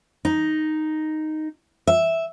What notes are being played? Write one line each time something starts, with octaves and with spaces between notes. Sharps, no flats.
D#4
E5